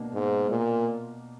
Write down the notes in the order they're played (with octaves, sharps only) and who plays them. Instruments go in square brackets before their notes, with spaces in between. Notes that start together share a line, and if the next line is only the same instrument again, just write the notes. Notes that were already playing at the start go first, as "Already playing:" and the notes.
Already playing: [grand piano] B2 A#3 D4
[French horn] G#2
A#2